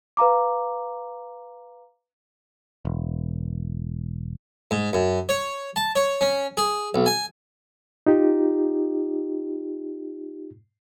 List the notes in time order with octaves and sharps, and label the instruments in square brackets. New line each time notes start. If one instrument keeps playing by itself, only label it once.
[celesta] B4 F5 A#5 D6
[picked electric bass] E1
[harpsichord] G#2
F#2
C#5
A5
C#5
C#4
G#4
B1
G#5
[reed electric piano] D#4 F4 G4